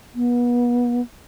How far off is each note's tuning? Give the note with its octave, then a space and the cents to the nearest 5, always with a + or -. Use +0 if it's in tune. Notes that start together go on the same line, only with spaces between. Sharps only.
B3 -30